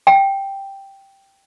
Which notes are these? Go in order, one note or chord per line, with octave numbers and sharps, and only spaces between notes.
G5